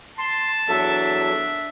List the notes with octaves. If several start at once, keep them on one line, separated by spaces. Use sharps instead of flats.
A5 C6
E2 F#3 D4 A4 E5